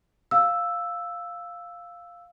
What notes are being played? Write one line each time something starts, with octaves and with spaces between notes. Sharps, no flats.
F5 E6